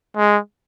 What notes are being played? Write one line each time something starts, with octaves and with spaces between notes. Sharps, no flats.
G#3